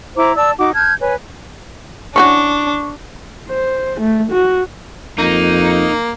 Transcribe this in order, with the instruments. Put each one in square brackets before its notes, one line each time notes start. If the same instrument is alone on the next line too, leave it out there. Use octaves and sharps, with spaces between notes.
[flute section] E4 C5 A#5 D6
D5 A5 E6
D#4 F#4 D6
A5 F6 G6 G#6
B4 C#5 G#5
[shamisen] E3 C#4 F#4 [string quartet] D4 [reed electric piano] C#6
[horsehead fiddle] C5
A3
F#4
[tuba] F2 [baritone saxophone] A#3 [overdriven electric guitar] D#4